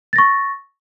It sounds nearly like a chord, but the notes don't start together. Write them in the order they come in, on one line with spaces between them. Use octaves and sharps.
A6 A#6 C#6